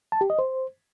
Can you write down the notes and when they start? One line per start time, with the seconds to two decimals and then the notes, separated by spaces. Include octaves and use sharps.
0.12 A5
0.21 G4
0.30 D#5
0.39 C5